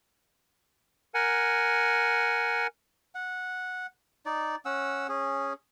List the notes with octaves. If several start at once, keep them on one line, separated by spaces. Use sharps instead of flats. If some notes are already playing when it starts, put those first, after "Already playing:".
A#4 F#5 G#5
F#5
D#4 D5
C#4 F#5 E6
C#4 G#4